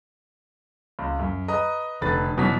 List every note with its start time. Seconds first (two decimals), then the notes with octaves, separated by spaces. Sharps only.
0.99 C#2
1.19 F#2
1.48 B4 D#5 A#5 D#6
2.01 F1 D3 B4 A6
2.37 E2 B2 F#3 F#4 B6